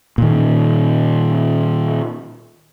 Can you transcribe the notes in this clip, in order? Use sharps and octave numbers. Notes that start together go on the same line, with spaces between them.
A#2 D#3